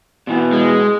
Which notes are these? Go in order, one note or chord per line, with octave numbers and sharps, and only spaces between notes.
B2 E3 B3
G#3